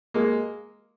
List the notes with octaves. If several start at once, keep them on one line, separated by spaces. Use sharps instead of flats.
G#3 A#3